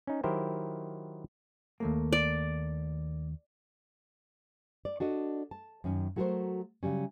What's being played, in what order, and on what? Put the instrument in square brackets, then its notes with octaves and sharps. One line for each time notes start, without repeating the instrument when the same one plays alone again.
[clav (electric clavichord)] C#4 D#4
D#3 F#3 E4 G4 A#4 C5
[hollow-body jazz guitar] D#2 A3 A#3
[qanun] D5
[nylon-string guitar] D5
D4 F#4 A4 D#5
A5
F#2 D#3 C#4
F#3 A3 F#4 G#4 A#4 C5
C#3 F#3 G3 C#4